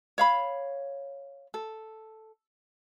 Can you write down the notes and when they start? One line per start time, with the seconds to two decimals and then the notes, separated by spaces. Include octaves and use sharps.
0.18 C#5 F5 B5
1.54 A4